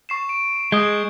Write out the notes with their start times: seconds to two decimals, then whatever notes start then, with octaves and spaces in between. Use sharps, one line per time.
0.09 C#6 C7 E7
0.29 D7
0.72 G#3 D#6 G6